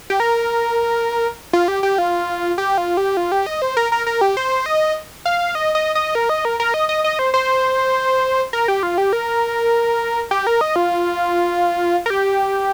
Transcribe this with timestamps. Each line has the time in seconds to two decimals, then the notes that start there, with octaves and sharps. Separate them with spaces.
0.10 G4
0.20 A#4
1.53 F4
1.68 G4
1.83 G4
1.98 F4
2.58 G4
2.78 F4
2.97 G4
3.17 F4
3.32 G4
3.46 D#5
3.62 C5
3.77 A#4
3.92 A#4
4.06 A#4
4.21 G4
4.37 C5
4.66 D#5
5.25 F5
5.55 D#5
5.75 D#5
5.95 D#5
6.15 A#4
6.29 D#5
6.45 A#4
6.60 A#4
6.74 D#5
6.89 D#5
7.04 D#5
7.19 C5
7.34 C5
8.53 A#4
8.68 G4
8.83 F4
8.98 G4
9.13 A#4
10.31 G4
10.47 A#4
10.61 D#5
10.76 F4
12.06 A#4
12.10 G4